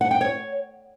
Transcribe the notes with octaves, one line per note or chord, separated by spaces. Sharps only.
F#5
G5
C#5